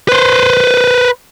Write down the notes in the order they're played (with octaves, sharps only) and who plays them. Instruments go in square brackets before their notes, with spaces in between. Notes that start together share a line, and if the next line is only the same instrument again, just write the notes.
[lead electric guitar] B4 C5